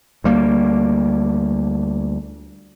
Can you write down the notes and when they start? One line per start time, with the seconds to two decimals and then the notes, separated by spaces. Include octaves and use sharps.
0.24 D2 G3 A#3